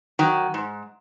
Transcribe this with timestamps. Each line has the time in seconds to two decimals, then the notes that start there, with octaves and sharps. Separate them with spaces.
0.19 D#3 F#3
0.54 G#2